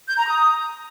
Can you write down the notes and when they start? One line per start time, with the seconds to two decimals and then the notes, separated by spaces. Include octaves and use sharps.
0.08 G6
0.17 A#5
0.27 D#6